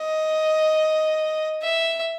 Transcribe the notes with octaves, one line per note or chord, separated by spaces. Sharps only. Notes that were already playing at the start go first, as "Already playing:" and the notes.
Already playing: D#5
E5